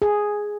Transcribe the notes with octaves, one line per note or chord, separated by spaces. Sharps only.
G#4